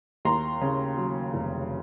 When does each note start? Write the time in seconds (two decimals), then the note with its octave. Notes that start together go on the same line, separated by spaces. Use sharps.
0.25 D#2 A#5 C6
0.61 C#3
0.97 F#3
1.34 F1